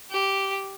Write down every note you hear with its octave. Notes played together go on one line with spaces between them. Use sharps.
G4